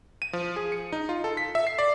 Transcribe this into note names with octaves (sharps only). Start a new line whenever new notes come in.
D#7
F3
G#4
C#7
D#4
F4
A4
B6
E5
C7
D5